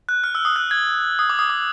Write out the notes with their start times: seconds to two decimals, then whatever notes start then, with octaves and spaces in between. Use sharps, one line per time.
0.09 F#6
0.24 F6
0.35 E6
0.45 D#6
0.56 F#6
0.71 G#6
1.19 D#6
1.30 D6
1.39 D#6
1.50 D6